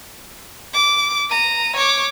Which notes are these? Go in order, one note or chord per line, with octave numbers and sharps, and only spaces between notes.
D6
A#5 D#7
C#5 D6